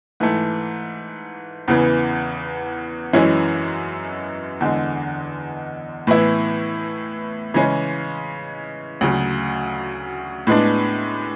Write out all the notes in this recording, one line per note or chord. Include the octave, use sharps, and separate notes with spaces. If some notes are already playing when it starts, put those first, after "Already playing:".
G#2 E3 A3
E2 C#3 E3 B3
F#2 E3 G#3 C#4 E4
E2 D3 G#3
A2 E3 B3 E4
C#3 E3 G#3 C#4
D2 C#3 F#3
A2 G#3 B3 D4